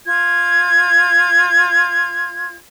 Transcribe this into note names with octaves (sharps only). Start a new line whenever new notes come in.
F4 G#6